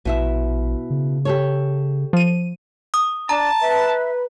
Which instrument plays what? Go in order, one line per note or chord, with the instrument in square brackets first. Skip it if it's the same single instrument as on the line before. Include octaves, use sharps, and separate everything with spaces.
[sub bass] A#1 [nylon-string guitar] B2 E4 E5
[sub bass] C#3
[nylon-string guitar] G4 A4 C#5
[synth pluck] F3 D#7
[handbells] D#6
[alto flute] D4 [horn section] A5 [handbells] A#5
[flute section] B4 [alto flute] E5